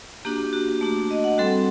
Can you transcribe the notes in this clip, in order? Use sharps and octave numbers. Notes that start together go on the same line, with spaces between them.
A#3 D4 F#4 G4
F#4
A3 D4 F#4
D#5
F#5
G3 C4 F#4 A4